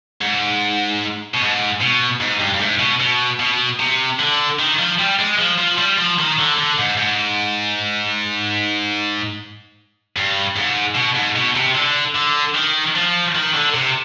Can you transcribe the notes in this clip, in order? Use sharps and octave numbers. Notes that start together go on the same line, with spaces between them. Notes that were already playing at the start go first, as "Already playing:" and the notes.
G#2
B2
G#2
B2
G#2
G2
G2
G#2
B2
B2
B2
C3
D3
D#3
F3
G3
G#3
F3
F3
G3
F3
D#3
D3
D3
G#2
G#2
G2
G#2
B2
G#2
B2
C3
D3
D3
D#3
F3
D#3
D3
C3